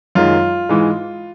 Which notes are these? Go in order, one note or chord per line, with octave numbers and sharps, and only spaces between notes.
F#2 D#3 G#3 F4
G#2 E3 G#3